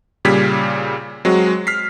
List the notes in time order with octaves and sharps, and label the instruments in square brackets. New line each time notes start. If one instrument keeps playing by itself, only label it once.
[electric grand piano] A#2 C#3 G3 G4 G#6 B6
F#3 G#3 C4 F#4
F6 B6 C7